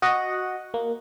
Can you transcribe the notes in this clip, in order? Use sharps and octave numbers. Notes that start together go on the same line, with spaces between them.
F#4 D#5 F#5
A#3